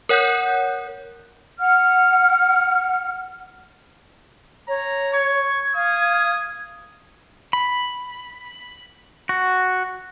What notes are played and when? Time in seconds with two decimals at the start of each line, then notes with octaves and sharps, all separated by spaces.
0.09 A#4 C#5 F#5 F#6 G6
1.60 F#5 F6
4.68 C#5 A#5
5.13 C#6 G#6
5.75 F5 D#6
7.53 B5
9.29 F#4